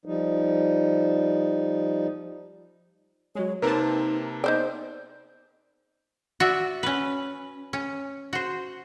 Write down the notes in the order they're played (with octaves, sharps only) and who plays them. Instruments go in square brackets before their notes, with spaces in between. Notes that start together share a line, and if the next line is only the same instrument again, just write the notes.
[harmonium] F3 G3 D#4
[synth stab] F#3 G#3 [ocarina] C#5
[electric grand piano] C3 A#3 C4 [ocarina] D#4 [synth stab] A#4 B4 A5
[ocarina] B3 [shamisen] D#4 C5 D5
[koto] F#4 D5 E5
C#4 B4
C#4
F#4 C5